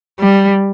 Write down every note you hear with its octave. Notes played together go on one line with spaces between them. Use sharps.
G3